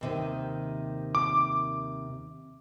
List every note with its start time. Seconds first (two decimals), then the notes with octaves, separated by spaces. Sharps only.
0.01 D#2 C3 D#3
1.15 D6